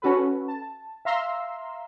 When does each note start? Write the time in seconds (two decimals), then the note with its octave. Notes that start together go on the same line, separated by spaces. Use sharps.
0.02 C#4 F#4 A4 B4
0.48 A5
1.05 E5 F5 A#5 C6 E6